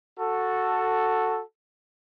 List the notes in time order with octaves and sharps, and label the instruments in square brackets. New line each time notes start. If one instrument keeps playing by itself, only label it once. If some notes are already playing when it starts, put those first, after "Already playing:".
[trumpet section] F#4 A4